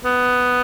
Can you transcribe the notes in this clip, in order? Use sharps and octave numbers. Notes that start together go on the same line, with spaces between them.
B3